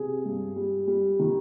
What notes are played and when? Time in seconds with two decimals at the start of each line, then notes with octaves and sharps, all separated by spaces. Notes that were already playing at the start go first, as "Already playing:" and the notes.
Already playing: C3 G#4
0.25 G2
0.56 G3
0.87 G3
1.19 D#3